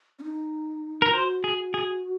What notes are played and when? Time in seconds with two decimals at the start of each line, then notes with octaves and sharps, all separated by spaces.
0.19 C#4
0.24 D#4
1.02 A#4
1.09 F4
1.14 F#4 C5
1.44 G#4
1.74 G#4